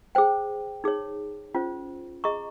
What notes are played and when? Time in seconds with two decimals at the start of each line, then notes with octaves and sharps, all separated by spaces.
0.15 G#4 C5 G5
0.84 D#4 G#4 C#5
1.54 C#4 F4 C5
2.24 G#4 D#5 A#5 C#6